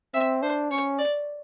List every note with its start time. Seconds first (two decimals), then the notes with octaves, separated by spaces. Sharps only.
0.14 C4 E5
0.43 D4 C5
0.70 C#4 C#5
0.99 D5